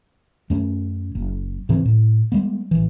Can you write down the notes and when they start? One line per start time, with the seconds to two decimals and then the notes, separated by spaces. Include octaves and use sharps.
0.50 F#2 A3 C#4
1.15 F#1
1.69 G#2 C#3 E3 C4
1.85 A2
2.32 G3 G#3 B3
2.71 A1 E3